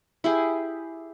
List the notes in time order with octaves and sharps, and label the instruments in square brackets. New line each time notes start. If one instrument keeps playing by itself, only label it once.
[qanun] E4 G4 G#4